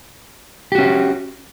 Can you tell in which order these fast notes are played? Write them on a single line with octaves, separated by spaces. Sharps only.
G4 F#4 C#4